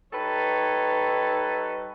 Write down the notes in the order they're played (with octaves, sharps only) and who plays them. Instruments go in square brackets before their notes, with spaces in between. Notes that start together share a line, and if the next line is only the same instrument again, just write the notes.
[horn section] G3 D#4 A4 B4 C#5